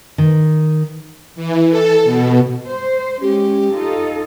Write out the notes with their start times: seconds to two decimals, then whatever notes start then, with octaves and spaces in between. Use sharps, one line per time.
0.18 D#3
1.36 E3
1.70 A4
2.05 B2
2.66 C5
3.22 G#3 C#4 G4
3.73 D#4 F4 A4